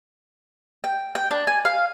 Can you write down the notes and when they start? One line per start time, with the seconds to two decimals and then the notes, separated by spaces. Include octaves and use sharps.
0.84 G5
1.15 G5
1.31 D4
1.47 G#5
1.65 F5